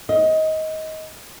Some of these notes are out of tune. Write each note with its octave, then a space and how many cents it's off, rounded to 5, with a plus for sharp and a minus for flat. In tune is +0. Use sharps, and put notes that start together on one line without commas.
D#5 +20